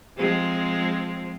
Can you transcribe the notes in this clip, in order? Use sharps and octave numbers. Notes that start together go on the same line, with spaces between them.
F3 G#3 C4